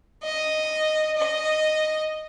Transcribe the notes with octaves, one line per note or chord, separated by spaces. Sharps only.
D#5
D#5